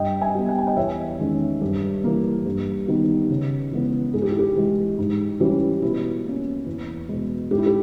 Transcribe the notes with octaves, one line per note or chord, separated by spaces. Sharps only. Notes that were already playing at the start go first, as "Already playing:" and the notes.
Already playing: G2 D#5 G5
E5 G#5
G3 B3
G5
G#5
D#5 G5
E2 C#5 E5
D#3 G#3 C#4
G2
E3 A#3
G2
D#3 G3 B3
C#3
E3 G#3 B3
G#2 G#4
G4
E4
G4
E3 G#3
G#2
E3 G3 C#4
B2 E4
A#3 C#4
E2
B2 G#3
G#2 G4
E4
G4